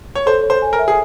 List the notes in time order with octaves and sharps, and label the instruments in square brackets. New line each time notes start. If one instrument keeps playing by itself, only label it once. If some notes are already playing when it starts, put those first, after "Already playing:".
[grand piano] C#5
[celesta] A4 [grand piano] C5
[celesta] C#5
[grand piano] C5
[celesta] G#5
[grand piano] A#4
[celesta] E5
[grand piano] G#4